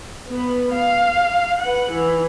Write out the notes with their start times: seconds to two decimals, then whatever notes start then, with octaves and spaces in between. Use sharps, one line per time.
0.28 B3 B4
0.72 F5
1.61 B4 F#5
1.91 E3